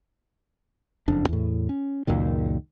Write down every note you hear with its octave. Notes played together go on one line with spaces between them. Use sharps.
F#1 F2 D4
E2 A2
C#4
C#2 F#2 A#2 D#3